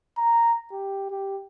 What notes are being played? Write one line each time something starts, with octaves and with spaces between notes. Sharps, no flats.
A#5
G4
G4